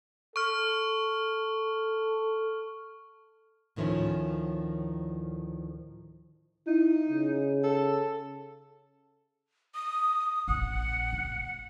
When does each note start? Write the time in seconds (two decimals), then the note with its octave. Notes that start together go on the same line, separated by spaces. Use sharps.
0.36 A4 C#6 F6
3.76 D2 A2 D#3 F3 A3 C#4
6.67 D#4 E4
7.08 C#3
7.64 A4
9.75 D#6
10.48 A#1 A#2 F#5
11.12 F#1